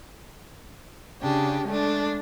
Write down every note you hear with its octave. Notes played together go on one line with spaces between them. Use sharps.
C#3 D4 G4
G#3 A3 D4